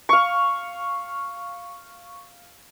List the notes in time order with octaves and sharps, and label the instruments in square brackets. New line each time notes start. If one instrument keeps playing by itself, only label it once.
[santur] F5 C#6